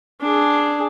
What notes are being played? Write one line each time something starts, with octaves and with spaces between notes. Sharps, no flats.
D4 G#4